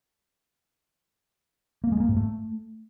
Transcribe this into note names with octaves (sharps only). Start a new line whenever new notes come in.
A#3
G#3
A#3
G#2
A3